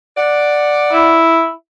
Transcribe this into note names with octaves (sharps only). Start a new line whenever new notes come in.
D5 F#5
E4